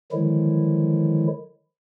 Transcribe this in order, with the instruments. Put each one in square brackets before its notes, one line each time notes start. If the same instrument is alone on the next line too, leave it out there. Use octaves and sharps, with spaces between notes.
[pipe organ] D3 D#3 F3 F#3 G#3 E4